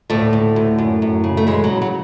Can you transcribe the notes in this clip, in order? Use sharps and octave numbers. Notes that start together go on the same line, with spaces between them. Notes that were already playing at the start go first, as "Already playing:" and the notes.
D2 A2 A3
D2
D2
F#2
F#2
C#3
A3
E3 G#3
F#3
C#3
F#3